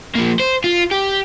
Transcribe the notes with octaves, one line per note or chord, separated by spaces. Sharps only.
F3 A#3
C5
F4
G4